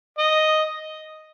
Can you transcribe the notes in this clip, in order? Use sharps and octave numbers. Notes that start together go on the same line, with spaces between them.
D#5